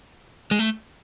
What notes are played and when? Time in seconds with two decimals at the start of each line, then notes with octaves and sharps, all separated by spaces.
0.51 G#3
0.59 A3